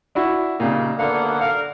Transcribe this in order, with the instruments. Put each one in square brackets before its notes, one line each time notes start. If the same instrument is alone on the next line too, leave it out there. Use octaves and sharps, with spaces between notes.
[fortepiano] D4 E4 F#4
[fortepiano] A#2 C#3 [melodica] G3 D#4
[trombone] D3 [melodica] A#3 B3 F#5 [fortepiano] F5
[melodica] A#4 [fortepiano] F5